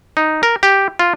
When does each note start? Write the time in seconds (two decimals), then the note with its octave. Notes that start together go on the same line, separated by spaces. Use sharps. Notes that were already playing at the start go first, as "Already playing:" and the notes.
0.17 D#4
0.43 A#4
0.63 G4
0.99 F4